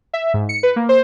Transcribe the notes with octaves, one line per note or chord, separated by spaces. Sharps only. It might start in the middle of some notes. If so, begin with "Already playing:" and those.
E5
G#2
C#7
B4
A#3
C5